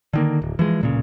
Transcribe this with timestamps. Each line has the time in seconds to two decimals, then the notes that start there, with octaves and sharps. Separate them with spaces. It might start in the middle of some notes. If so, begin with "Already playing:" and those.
0.14 D3 D#3 A#3
0.42 D1
0.59 E3 F3 G#3
0.81 D1 A#2 C#3